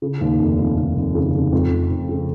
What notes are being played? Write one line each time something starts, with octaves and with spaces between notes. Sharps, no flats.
C#3
D#2
F1
F1
F1
F1
C#3
C#3
F2
F1
F1
C#3